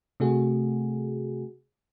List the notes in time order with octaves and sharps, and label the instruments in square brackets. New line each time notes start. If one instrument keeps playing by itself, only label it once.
[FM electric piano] C3 A3 F#4 G#4